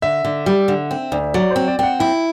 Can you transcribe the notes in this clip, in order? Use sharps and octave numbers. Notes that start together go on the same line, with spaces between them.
D3 E5
D3
G3
D3
C4
D2
F#3 D5
C5
C4
D5
C4 F#5 G5
E4 G5